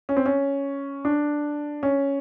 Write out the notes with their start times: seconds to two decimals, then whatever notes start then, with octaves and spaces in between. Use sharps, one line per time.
0.09 C#4
0.17 C4
0.26 C#4
1.05 D4
1.83 C#4